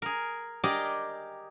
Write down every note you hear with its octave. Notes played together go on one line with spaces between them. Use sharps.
G#4 A#4
G4 G#4 A#4 D5 D#5 G5